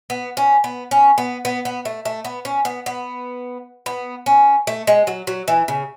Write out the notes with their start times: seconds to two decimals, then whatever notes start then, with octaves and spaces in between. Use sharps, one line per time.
0.10 B3
0.37 C#4
0.64 B3
0.91 C#4
1.18 B3
1.45 B3
1.65 B3
1.85 A3
2.05 A3
2.25 B3
2.45 C#4
2.65 B3
2.86 B3
3.86 B3
4.26 C#4
4.67 A3
4.87 G#3
5.07 F#3
5.27 F#3
5.48 E3
5.68 C#3